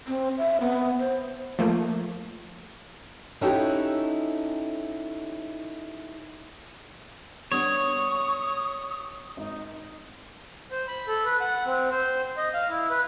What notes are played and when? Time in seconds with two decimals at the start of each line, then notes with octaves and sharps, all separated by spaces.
0.08 C4
0.38 E5
0.61 B3
0.99 C5
1.59 F3 A3 A#3
3.41 C#4 D#4 E4 F#4 G4 A4
7.52 G3 B3 D4 C#5 C#6 D#6
9.37 G#1 D#4
10.71 C5
10.88 B5
11.08 A4
11.25 B4
11.41 F#5
11.66 C4
11.91 C5
12.37 D#5
12.54 F5
12.69 E4
12.90 B4